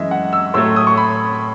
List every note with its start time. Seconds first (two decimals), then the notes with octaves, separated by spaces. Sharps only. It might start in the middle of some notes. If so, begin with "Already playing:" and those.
Already playing: F#2 E3 G#3 D#5 E5
0.11 F#5
0.33 E6
0.54 A2 F#3 A3 E6
0.76 D#6
0.87 C#6
0.97 B5